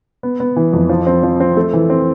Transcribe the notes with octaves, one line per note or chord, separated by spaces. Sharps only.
B3
B3
E3
F2
F3
C4
F3
C4
A3
E3
C4